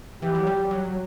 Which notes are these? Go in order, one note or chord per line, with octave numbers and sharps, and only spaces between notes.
E3 G4
F#3
G3
F#3